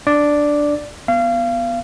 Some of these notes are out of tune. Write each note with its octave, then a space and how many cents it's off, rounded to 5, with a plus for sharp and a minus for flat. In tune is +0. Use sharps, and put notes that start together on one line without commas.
D4 +0 D5 +0
B3 -5 F5 -30